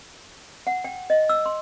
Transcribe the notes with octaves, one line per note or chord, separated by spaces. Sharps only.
F#5
G5
D#5
E6
C6